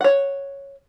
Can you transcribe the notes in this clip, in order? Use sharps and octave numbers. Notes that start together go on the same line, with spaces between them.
C#5 F#5